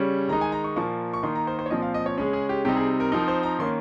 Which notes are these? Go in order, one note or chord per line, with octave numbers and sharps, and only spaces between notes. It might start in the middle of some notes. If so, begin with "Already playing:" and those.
Already playing: C#3 G3 C#4
D#3 G#3 D#4 A#5
G#5
A#5
C#6
A#2 F3 A#3 C#6
C#6
D#3 A#3 D#4 C6
A#5
C5
C5
C#5
A#2 F3 C4 D#5
F5
D#5
C#5
C#3 G#3 C#4 G#4
G#4
G4
C3 G3 C4 D#4 G4
G#4
A#4
F3 C4 D#4 A#4
C5
A#5
D#3 A#3 C#4 C6